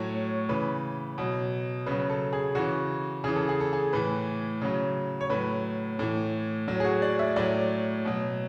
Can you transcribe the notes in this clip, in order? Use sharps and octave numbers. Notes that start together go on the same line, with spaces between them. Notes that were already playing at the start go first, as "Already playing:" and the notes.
Already playing: A2 F#3 C#5
C#3 E3 B4
B2 F#3
C#3 F#3 B4
A4
G#4
C#3 E3 F#4
C#3 E3 G#4
A4
G#4
A4
G#4
A2 E3 B4
C#3 F#3
C#5
A2 F#3 B4
A2 E3
A2 F#3
G#4
F#4
D5
E5
A2 F#3 D5
B2 F#3